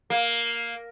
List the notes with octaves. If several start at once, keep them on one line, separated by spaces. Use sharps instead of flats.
A#3